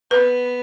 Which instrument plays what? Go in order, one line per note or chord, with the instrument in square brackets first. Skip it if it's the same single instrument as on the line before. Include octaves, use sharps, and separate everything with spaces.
[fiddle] B3 [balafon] B4